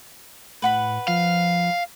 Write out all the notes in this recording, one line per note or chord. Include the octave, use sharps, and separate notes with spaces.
A2 B4 F#5 B5
F3 F5